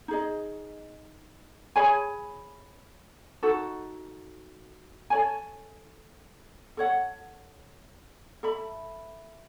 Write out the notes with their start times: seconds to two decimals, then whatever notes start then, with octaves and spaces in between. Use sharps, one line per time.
0.08 D#4 G#4 D#5
1.76 G#4 C#5 G#5 B5
3.43 D#4 F#4 A4
5.10 A4 C#5 G#5
6.77 A4 C#5 F#5
8.43 A4 E5 B5